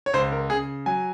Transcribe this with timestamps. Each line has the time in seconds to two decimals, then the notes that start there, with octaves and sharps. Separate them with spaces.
0.06 C#5
0.13 C#2 C5
0.32 A#4
0.50 C#3 G#4
0.86 F#3 G#5